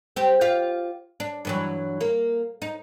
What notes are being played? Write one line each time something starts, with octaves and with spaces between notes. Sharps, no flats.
C4 G4
F4 G4 F5
D4
G2 E3 F#3
A#3
D#4